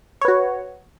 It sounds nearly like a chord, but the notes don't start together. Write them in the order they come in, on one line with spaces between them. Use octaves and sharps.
C#5 B4 F#4